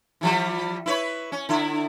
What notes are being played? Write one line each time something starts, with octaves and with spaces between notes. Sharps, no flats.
E3 F3 G3
E4 B4 C#5
C#4
D3 E4